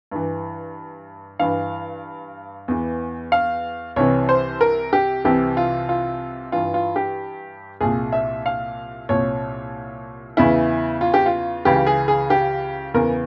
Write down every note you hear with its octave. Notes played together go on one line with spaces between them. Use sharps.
G2 E3
G2 E3 F5
E2 E3
F5
C2 C3 E3 C#5
C5
A#4
G4
C2 C3 E3 G4
F4
F4
G2 E3 F4
F4
G4
C2 A#2 G#4
E5
F5
C2 A#2 C#5
E2 C#3 E3 E4
F4
G4
F4
C#2 C#3 E3 G4
G#4
G#4
G4
E2 C#3 E3 A#4